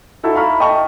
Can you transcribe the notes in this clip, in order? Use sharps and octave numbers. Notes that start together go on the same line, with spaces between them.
D#4 E4 F#4 A4 A5
E5 F5 A#5 B5 C#6 F6
D#5 G5 A5 C#6